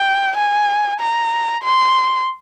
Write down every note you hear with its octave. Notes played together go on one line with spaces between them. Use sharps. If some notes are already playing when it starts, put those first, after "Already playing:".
Already playing: G5
G#5
A#5
C6